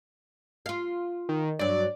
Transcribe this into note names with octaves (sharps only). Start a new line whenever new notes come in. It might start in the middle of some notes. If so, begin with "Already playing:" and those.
F4 F5
D#3
G2 F#3 D5